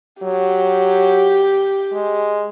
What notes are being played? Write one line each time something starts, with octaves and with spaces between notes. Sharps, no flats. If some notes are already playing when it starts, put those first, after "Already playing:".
F#3 G4
G#3